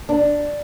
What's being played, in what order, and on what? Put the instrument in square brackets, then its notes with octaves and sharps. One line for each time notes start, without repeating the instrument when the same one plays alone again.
[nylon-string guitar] D4